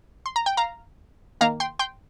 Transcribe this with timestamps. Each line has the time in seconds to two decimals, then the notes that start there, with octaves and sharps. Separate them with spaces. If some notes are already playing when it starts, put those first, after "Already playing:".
0.26 C6
0.36 A#5
0.46 G5
0.57 F5 A#5
1.41 D#3 A#3 F5 A#5
1.60 G5 C6
1.79 G5 C6